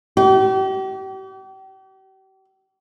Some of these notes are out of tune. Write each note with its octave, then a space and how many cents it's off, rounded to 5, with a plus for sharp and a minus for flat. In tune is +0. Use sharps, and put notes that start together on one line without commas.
G4 -40